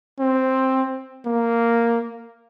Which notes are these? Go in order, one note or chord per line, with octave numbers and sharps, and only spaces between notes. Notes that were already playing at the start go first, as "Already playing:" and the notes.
C4
A#3